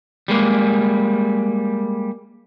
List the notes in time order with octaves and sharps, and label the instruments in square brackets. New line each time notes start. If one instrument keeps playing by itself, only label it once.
[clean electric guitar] G3 G#3 A#3